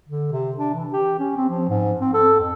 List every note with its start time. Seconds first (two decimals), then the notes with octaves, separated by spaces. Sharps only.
0.09 D3
0.32 C3
0.58 D4
0.75 E3
0.93 G4
1.19 C#4
1.37 C4
1.49 F3
1.69 G#2
2.01 C4
2.14 A4
2.41 F2